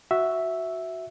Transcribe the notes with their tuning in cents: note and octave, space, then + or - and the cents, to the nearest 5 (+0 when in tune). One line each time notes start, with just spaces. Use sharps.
F#4 +0 E5 +0